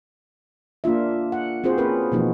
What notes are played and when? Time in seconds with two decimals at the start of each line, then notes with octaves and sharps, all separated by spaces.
0.84 A#3 D4 F4 E5
1.32 F#5
1.64 C4 F4 F#4 G#4 C5
1.77 A#3 C#4 G#4 A#4 B4
2.12 B2 E3 F3 A#3 D#4 F#4